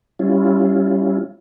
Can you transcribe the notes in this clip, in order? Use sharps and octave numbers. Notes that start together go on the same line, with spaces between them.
G3 C#4 E4 F4